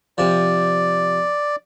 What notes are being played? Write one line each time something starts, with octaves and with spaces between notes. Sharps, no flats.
C3 F3 D5